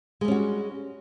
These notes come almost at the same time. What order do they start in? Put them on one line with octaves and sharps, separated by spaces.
G#3 G3 C#4 F#4